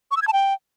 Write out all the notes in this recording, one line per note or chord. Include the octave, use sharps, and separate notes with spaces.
C#6
E6
G#6
A5
G5